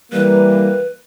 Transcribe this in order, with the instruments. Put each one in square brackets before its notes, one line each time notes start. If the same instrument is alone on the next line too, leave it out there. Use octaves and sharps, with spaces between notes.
[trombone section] E3 G3 A#3 [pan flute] B4